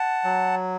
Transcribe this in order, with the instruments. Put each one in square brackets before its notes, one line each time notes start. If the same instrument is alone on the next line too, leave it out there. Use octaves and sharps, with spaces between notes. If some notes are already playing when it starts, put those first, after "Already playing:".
Already playing: [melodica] F#5 A5
F#3